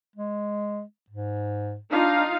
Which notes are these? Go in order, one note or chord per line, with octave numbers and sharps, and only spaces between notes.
G#3
G#2
D4 D#4 F4 F5